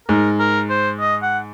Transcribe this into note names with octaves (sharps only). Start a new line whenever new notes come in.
G#2 A#4
A#4
C5
D#5
F#5